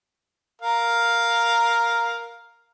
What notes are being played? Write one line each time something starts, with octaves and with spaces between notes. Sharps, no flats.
A#4 F5